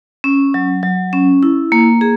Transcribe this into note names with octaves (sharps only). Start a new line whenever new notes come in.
C#4
F#3
F#3
C#4
E4
A#3
G#4